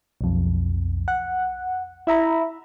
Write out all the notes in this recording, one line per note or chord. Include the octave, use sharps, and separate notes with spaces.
B1 F2
F#5
E4 E5 A#5 B5